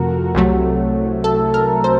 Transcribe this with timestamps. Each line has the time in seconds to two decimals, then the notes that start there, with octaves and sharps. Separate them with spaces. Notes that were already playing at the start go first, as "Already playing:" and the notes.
Already playing: F2 C3 F3 A3 F#4 A#4
0.35 C2 C3 F#3 A3
1.24 A4
1.54 A#4
1.84 C5